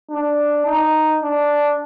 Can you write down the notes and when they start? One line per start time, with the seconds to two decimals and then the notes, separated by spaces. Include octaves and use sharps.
0.10 D4
0.66 D#4
1.23 D4